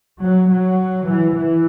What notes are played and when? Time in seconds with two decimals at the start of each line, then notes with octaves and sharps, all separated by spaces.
0.21 F#3
0.50 F#3
1.08 E3
1.37 E3